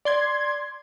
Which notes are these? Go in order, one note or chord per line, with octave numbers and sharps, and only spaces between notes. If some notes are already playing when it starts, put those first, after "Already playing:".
D5 C6 G#6